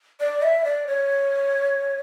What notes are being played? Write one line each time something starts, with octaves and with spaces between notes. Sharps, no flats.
D5
E5
D5
C#5